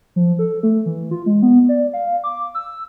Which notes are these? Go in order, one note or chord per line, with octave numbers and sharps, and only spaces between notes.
F3
A4
A3
E3
F4
G#3
B3
D5
F5
D6
E6